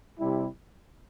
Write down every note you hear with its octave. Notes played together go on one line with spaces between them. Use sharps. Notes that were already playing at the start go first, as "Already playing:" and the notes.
C3 G3 E4